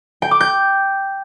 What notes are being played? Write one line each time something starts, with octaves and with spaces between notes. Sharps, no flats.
G5
D6
G6